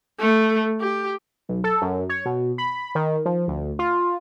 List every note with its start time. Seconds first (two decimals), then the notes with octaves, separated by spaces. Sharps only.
0.19 A3
0.80 G4
1.49 B1
1.64 A4
1.82 F#2
2.09 C#5
2.26 B2
2.58 B5
2.95 D#3
3.26 F3
3.48 D2
3.79 F4